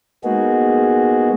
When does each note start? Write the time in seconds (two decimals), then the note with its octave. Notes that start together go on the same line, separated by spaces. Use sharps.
0.24 G#3 A#3 B3 D#4 F#4 G#4